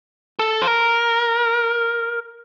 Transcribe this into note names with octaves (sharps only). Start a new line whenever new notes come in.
A4
C5
A#4